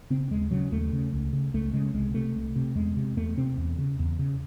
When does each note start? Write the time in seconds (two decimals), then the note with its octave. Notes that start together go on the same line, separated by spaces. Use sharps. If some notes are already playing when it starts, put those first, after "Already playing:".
0.10 C#3 C4
0.31 D#2 G#3
0.51 C#3 F#3
0.72 D#2 A3
0.92 C#3
1.12 C#2
1.33 C#3
1.54 C#2 A3
1.73 C#3 G#3
1.94 C2 G#3
2.14 C3 A3
2.35 C2
2.56 C3
2.75 E2 G#3
2.97 C3
3.17 E2 A3
3.37 C3 C4
3.58 E2
3.79 C#3
3.99 E2
4.19 C#3